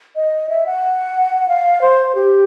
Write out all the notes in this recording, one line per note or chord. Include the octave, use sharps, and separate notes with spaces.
D#5
E5
F#5
F5
C5
G4